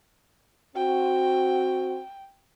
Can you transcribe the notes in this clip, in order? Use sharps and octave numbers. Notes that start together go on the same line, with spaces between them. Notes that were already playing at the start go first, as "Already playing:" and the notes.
C4 F#4 G5